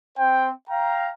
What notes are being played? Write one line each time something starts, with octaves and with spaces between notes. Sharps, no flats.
C4 C5 G5
F5 G5 A#5